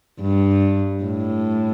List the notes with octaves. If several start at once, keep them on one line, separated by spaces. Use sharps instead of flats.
G2
A2